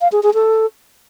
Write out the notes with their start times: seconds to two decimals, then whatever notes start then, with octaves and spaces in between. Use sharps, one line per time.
0.01 F5
0.12 G#4
0.23 G#4
0.34 A4